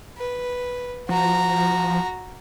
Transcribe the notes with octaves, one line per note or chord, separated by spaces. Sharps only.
B4
F3 F#4 A#5